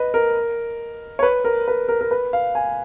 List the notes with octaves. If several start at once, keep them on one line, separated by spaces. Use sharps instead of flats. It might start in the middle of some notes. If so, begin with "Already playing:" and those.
Already playing: B4 D#5
A#4
C#5
B4
A#4
B4
A#4
A#4
B4
F5
G#5